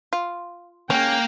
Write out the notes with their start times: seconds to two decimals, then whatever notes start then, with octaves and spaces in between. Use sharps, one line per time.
0.13 F4
0.90 C#3 A#3 C#4 G5